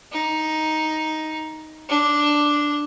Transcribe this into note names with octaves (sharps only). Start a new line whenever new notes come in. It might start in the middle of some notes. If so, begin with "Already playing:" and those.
D#4
D4